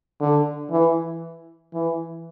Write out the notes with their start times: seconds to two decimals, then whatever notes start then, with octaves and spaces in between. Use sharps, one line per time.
0.21 D3
0.71 E3
1.74 E3